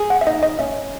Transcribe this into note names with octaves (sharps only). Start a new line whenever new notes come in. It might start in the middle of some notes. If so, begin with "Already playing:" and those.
Already playing: G#4
F#5
E5
D#4 D#5
D#5
C#4 E5